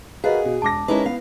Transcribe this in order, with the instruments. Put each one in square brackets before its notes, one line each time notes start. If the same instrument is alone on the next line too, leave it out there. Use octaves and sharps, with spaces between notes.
[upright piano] F#4 A#4 B4 [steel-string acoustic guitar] G#4 [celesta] D#5 F5
[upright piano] B2
[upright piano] E1 A#6 [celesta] A5 D6
[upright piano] G#3 C#4 D#4 [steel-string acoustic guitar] E4 A#4 B4
[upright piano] B3 [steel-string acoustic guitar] F5